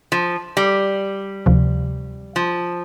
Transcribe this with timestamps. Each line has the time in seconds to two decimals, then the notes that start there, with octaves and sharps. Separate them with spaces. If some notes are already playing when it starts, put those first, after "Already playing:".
0.12 F3
0.57 G3
1.46 D2 C3 F3
2.36 F3